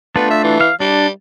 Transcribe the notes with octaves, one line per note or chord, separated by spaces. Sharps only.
A3 B3 D4 F4
E5
E3
F5
G3 D4